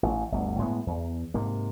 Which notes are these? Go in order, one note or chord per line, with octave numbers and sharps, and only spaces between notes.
A1
G1 D2
A2 G#3 A3 B3
E2
G#2 C3 A#3